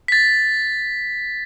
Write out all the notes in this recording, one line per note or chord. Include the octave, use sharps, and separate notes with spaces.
A6 B6